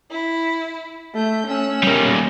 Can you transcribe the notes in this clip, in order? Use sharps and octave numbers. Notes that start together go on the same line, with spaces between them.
E4
A3 E5 G6
A3 C#4 E6 F#6
B2 G3 A#3